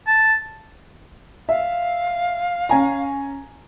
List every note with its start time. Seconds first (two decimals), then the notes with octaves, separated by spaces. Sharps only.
0.07 A5
1.49 E5 F5
2.69 C#4 G#5 A#5